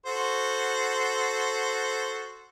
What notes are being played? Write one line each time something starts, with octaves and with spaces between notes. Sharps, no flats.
F#4 A4 C5